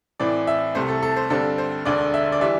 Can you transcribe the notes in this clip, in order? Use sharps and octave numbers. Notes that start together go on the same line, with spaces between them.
A2 E3 C4 D5
E5
C2 C3 A3 C5
A4
A4
C5
G2 D3 G3 C4 A4
C5
E1 D2 D3 D5
E5
D5
E3 G3 D4 E5